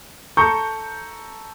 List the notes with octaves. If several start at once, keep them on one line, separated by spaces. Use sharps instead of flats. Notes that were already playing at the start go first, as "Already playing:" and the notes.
A4 A#5 C#6 G6